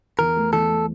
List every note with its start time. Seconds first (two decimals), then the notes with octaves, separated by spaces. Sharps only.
0.19 E2 A#4
0.37 A3
0.53 E2 A4
0.69 A3